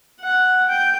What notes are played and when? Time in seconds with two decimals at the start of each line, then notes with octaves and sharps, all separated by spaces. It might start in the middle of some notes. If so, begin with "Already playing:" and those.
0.21 F#5
0.69 G5